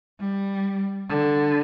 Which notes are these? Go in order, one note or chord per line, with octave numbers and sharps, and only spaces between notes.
G3
D3